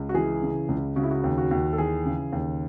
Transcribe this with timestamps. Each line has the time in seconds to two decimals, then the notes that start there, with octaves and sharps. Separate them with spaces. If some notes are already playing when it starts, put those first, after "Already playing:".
Already playing: C#2
0.09 F#4
0.14 E3 G#4
0.42 C#3
0.68 C#2
0.96 C#3 F#4
1.03 E4
1.11 F#4
1.24 D#2
1.38 F#4
1.51 D#2
1.73 A4
1.78 E3 G#4
2.06 C#3
2.32 D#2